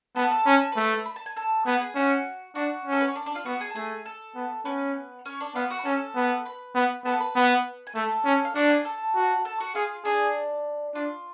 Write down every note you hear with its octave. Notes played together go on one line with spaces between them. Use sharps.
B3 A4 A5
A4 A5
C#4 B5
A5
A3 B4 B5
B5
A5
G#5
A4 A5
B3 G#4 G#5
G#4 G#5
C#4 F#4 F#5
D4 F#4 F#5
C#4
A4
B4
C#5
D4 D5
D4 D5
F4 F5
B3 F#4 F#5
G#4 G#5
A5
A3 G#4 G#5
A4 A5
B3
B3 C#4 B4
C#4 C#5
D4 D5
B3 F4 F5
F#4 F#5
B5
C#4 A4 A5
B3
B4 B5
B3
B3 A4 A5
B4 B5
B3
G#5
A3 A4 A5
C#4
F5
D4 F#4 F#5
G#4 G#5
A4 A5
F#4
A4 A5
F#4 F#5
F4 G#4 F5
D4 G#4 D5
D4 F4